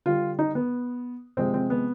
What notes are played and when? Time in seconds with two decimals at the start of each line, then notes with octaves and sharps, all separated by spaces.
0.06 D3 G3 F4
0.39 D#4
0.55 B3
1.37 C3 F3 G#3 C4
1.54 C4
1.70 B3